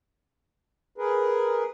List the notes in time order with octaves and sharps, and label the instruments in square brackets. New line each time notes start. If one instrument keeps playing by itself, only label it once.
[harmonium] G#4 A#4 B4